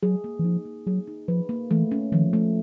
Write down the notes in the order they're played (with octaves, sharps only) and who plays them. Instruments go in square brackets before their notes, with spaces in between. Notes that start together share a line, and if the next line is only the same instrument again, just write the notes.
[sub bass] F#3 [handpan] G#4
[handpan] A#3
[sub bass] E3
[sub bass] F3 [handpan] D#4
[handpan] A#3
[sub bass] F#3 [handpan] G#4
[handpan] D#4
[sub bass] F3 [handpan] B4
[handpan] A#3
[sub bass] E3 [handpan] A3
[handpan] C#4
[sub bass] D#3 [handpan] F3
[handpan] A3